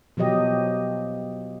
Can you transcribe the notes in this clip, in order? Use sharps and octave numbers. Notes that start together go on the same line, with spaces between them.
B2 F3 F#3 G4 D#5